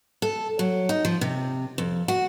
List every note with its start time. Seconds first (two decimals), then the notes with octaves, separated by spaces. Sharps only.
0.22 A4
0.59 F#3
0.89 D#4
1.05 F3
1.21 C3
1.78 F2
2.08 F#4